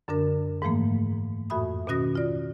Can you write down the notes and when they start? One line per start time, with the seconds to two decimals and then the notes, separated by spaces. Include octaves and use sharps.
0.08 F#2 D3 D4 A#4
0.62 G#2 E3 F3 A3 A#3
1.50 F2 A2 F#4 E5 B5 D#6
1.87 B2 D#3 C#4 F#4 D#6 A#6
2.15 F4 D5